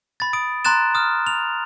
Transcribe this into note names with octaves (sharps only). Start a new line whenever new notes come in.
B5 A6
D#6 D7
A#5 C6 F#6 A6 E7
D#6 F6
F7